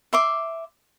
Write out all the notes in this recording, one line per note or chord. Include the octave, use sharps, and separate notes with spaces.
E5 C6 D6